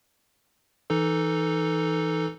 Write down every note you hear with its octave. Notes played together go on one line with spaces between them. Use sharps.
E3 D#4 A4